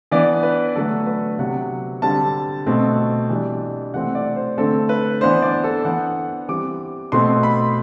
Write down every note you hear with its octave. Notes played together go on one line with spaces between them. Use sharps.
E3 B3 D4 D5
B4
D3 F#3 A3 D4 A4
B4
C3 F#3 B3 F#5
D3 G3 C4 A5
B2 A3 C4
E3 G3 D4
C3 E3 A3 C4 F#5
D5
C5
D3 A3 C4 A4
B4
E3 B3 D4 C5
D5
A4
E3 B3 D4 F#5
E3 G3 C4 D6
B2 A3 C4 C6
B5